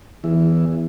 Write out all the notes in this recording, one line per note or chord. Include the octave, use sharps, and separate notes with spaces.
E2 E3